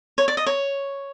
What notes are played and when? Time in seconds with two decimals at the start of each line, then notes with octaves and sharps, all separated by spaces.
0.18 C#5
0.28 D5
0.37 D#5
0.46 C#5